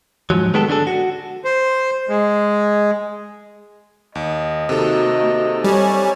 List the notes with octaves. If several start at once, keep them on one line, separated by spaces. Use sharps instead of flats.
G#2 F3 F#3
D#3 G#3 B3 G4 A4
D3 D4 G#4 A4
F#4
C5
G#3
D#2 D#5
C3 D#3 A#3 D#4 F#4 A4
G3 C#5 G#5